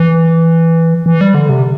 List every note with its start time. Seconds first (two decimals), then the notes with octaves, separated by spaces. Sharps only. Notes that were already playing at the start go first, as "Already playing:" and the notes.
Already playing: E3
1.06 E3
1.21 G3
1.35 D3
1.49 C3